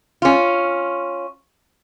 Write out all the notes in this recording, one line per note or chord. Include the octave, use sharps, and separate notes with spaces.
C#4 F4